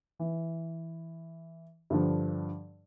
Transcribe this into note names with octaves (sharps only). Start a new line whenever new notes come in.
E3
G2 D3 F3